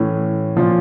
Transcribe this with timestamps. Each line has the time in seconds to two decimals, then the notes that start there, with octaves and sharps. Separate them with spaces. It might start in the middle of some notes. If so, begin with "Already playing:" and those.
Already playing: A2 E3 C#4
0.57 A#2 F3